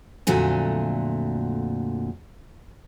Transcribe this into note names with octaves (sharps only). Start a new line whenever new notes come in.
F2 A#2 D3 F#3 A3 G#5